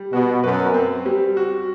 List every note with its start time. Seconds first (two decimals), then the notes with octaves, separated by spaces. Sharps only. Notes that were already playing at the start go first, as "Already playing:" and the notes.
Already playing: G3
0.12 B2 F#4
0.43 F#2 B4
0.74 C4
1.06 G3
1.37 F#4